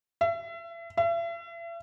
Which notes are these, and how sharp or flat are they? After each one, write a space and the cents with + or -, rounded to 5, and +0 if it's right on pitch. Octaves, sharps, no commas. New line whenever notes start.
E5 +35
E5 +40